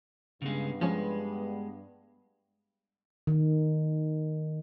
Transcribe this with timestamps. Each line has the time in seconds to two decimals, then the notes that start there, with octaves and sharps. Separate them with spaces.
0.42 G2 C#3 G#3 B3
0.81 F3 G#3 C#4
3.27 D#3